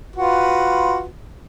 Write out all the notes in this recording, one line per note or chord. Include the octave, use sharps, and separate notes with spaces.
F4 F#4 B4